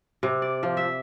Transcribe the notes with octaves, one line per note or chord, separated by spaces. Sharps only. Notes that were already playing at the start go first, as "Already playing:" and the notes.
C3
D5
F3
E5